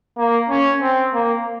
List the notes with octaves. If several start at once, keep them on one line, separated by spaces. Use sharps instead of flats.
A#3
C#4
C4
A#3